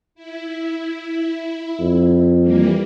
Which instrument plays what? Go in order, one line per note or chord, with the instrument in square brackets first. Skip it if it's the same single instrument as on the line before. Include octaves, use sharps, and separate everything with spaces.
[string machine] E4
[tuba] F2
[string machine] E3 G3 A#3